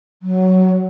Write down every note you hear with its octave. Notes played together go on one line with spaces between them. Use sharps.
F#3